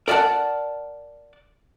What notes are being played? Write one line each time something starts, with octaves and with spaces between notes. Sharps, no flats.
A#4 D5 E5 F#5 A5